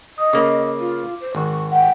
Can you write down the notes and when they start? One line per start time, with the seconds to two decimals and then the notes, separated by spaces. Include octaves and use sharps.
0.18 D#5 D#6
0.33 C#3 A#3 D6
0.80 F4
1.21 C5
1.35 G#1 C#6
1.72 F#5 G5